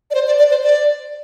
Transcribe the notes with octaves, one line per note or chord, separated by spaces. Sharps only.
D5
C5
D5
D5
C5
D5